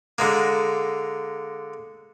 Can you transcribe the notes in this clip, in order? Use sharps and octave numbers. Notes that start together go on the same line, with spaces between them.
D3 G#3 A#3